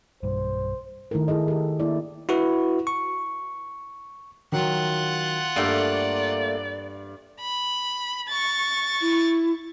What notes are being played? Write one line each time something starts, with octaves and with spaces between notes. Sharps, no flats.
B1 G2 C5
D#3 A3 E4 A4 A#4
E4 G#4 A4 D#5
G4 A4
A#3 E4 D5
E4 F#4 B4
C#6
D#3 F#3 F4 F#5
G2 A3 A#3 D5
B5
C#6 A6
E4